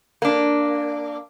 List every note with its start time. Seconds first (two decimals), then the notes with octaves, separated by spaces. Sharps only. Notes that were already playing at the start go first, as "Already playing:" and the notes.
0.22 A#3 D4